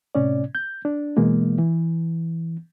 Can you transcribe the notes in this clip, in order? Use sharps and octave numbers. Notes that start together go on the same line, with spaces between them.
A2 C3 C#4 D5
G6
D4
B2 E3 G#3 A#3
E3